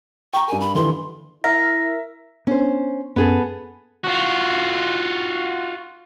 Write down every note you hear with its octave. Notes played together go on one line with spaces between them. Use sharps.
G5 A#5 C#6
G2 A#4 G#5
B5
D#2 D3 E3 C6
E4 A#4 E5 A#6
B3 C#4 D4 C5
F#2 B3 C#4 G#4 A4
F4 F#4